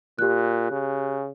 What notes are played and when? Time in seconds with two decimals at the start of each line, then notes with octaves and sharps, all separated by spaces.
0.19 A#2 G4 F#6
0.71 C#3